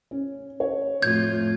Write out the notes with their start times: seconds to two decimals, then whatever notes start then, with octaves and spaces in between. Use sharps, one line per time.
0.11 C#4
0.60 C#5
1.02 F2 A2 F4 G6 G#6